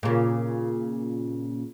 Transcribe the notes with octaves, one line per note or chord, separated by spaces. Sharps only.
A#2 C#3